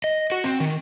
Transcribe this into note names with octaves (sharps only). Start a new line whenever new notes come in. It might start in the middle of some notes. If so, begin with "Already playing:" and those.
D#5
F#4
C4
D#3